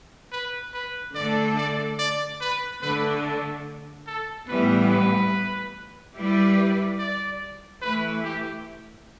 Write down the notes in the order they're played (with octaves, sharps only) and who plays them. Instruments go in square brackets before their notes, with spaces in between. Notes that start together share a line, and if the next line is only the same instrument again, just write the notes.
[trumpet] B4
B4
[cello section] D3 A3 D4 A4 [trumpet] D5
[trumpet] D5
D5
B4
[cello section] D3 A3 D4 [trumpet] B4
[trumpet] A4
A4
[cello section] A2 E3 G3 B3 [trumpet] B4
[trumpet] B4
[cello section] G3 E4 G4 B4 D5
[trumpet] D5
[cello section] E3 A3 E4 [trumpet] B4
[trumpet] G4